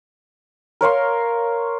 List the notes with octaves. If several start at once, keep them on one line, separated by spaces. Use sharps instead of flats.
A#4 C#5 F5 C6